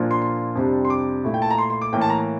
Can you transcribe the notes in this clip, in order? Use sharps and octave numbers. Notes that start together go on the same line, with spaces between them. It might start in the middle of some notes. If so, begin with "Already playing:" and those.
Already playing: A#2 F3 A#3 D4 F4
C6
C6
F2 C3 G3 D4
C6
D6
A#2 A3 E4
G5
A5
A#5
C6
C6
D6
A2 E3 A#3 G5
A5
A#5